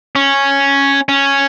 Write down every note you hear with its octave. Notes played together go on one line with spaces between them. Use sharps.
C#4
C#4